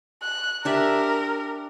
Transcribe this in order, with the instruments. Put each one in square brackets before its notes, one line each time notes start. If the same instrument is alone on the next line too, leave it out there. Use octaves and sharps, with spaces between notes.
[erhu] F#6
[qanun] D4 G4 E5 [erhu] A#4